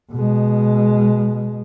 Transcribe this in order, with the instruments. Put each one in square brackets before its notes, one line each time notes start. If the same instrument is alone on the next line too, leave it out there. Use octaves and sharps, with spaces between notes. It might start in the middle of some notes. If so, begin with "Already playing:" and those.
[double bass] B2 G#3